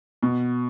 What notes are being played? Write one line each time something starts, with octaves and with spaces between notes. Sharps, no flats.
B2